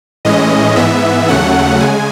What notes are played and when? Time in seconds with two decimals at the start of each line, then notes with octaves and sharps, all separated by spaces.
0.25 A2 E3 G#3 C#4 D#5
0.76 G#2 E3 B3 E5
1.28 D#2 C#3 F#3 A3 C#4 F#5
1.80 C#3 G#3 G#5